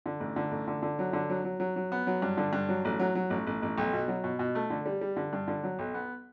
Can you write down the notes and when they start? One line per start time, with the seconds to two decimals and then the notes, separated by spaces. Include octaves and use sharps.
0.06 D3
0.20 A1
0.36 D3
0.51 A1
0.68 D3
0.82 D3
0.99 F#3
1.13 D3
1.30 F#3
1.44 F#3
1.60 F#3
1.76 F#3
1.92 B3
2.07 F#3
2.22 G2
2.37 D3
2.53 G2
2.69 F#3
2.85 A1
2.99 F#3
3.15 F#3
3.30 A1
3.47 A1
3.62 A1
3.78 B1
3.93 B2
4.08 F#3
4.24 B2
4.39 B2
4.55 A3
4.70 D3
4.86 G3
5.01 G3
5.16 D3
5.33 G2
5.48 D3
5.64 F#3
5.79 B1
5.94 B3